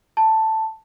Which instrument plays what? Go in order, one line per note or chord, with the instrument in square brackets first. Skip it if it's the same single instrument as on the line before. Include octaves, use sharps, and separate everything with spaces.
[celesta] A5